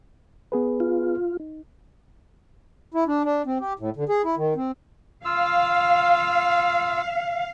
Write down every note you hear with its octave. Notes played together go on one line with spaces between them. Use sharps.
B3 G#4 B4
F4
D#4
E4
D4
D4
C4
G4
A2
D3
G#4
E4
D#3
C4
F4 F5 E6